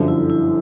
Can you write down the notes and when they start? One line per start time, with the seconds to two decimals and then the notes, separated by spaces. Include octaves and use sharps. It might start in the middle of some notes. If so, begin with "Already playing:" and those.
Already playing: G1 F#2 D3 F3
0.08 E4
0.30 E4